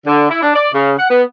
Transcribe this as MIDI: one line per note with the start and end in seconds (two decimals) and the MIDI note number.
0.07 0.30 50
0.30 0.39 64
0.42 0.54 62
0.55 0.69 74
0.73 0.94 49
0.98 1.08 78
1.10 1.23 59